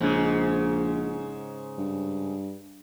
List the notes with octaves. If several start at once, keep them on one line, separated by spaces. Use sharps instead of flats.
A#1 G#2 C#3
G2